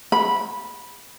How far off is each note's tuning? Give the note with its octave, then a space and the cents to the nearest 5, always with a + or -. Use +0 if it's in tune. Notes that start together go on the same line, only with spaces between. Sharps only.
B5 -10